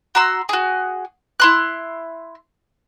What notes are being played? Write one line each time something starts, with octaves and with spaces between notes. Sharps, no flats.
F#4 A#5 C6 E6
F#4 G#4
E4 C6 F#6